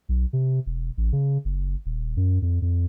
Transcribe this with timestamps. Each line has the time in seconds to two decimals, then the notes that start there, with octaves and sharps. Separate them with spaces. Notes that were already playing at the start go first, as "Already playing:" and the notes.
0.09 B1
0.33 C3
0.66 E1
0.97 A1
1.13 C#3
1.45 F#1
1.86 D#1
2.17 F#2
2.42 F2
2.62 F2